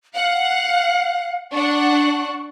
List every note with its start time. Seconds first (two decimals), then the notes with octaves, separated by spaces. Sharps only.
0.15 F5 F#5
1.52 D4 F#5 C#6